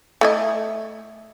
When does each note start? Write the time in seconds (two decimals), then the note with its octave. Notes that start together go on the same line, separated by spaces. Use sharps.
0.21 A3 E4 D#5